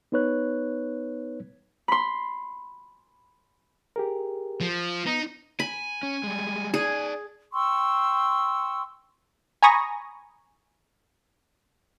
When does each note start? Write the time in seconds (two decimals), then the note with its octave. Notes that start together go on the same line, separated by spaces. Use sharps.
0.12 B3 D#4 B4 C#5 F#6
1.88 B5 C6
3.96 G4 G#4 A#4
4.61 F3
5.06 B3 D#4
5.60 G#5 B5
6.03 C#4
6.23 G3 G#3
6.74 D#4 G#4 D5
7.53 G5 C6 C#6 E6
9.63 G#5 A#5 B5 C#6 D#6 A#6